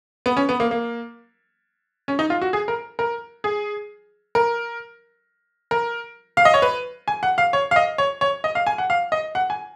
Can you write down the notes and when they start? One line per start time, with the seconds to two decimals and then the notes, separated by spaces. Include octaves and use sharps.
0.26 B3
0.37 C#4
0.49 B3
0.60 A#3
0.71 A#3
2.08 C#4
2.19 D#4
2.30 F4
2.41 F#4
2.53 G#4
2.68 A#4
2.99 A#4
3.44 G#4
4.35 A#4
5.71 A#4
6.37 F5
6.45 D#5
6.54 C#5
6.62 B4
7.08 G#5
7.23 F#5
7.38 F5
7.53 C#5
7.71 F5
7.76 D#5
7.98 C#5
8.21 C#5
8.44 D#5
8.55 F5
8.67 G#5
8.78 F#5
8.90 F5
9.12 D#5
9.35 F#5
9.50 G#5